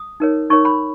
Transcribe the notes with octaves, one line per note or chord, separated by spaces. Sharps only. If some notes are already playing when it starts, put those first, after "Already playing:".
Already playing: D#6
D#4 A#4 C#5
D#4 A#4 C#5 C#6
B5